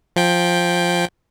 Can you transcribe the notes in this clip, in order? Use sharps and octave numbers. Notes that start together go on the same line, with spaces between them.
F3 G5